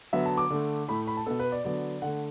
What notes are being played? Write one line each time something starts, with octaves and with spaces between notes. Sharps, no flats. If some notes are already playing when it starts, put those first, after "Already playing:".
D3 F#3 B3 E5
A5
D6
D3 A3
A2 A3 B5
B5
A5
B2 B3 A4
B4
D5
D3 F#3 B3 D5
D3 A3 F#5